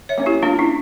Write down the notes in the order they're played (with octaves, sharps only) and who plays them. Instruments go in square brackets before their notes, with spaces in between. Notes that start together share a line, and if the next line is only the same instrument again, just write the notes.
[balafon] C#5 E5
[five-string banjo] A#3 C#4
[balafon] E4 G4
[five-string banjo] A#3 [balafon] D4 F4
[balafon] C#4 E4